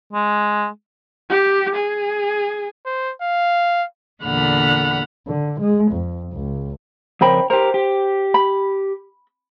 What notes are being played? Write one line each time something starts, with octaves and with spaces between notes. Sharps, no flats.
G#3
G4
G#4
C5
F5
E2 A#2 D3 F#5 B5 F6
D3
G#3
F2
C#2
F2 C#3 A#4 C5 G5 B5
G4 A#4 C5
G4
B5